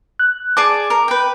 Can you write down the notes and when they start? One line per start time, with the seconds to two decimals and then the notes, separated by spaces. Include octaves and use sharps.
0.19 F#6
0.57 G#4 D5 A5 D6
0.90 A#4
1.08 B4 G5